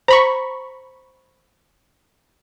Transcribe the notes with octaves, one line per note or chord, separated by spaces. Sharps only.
C5 A#5 B5 C#6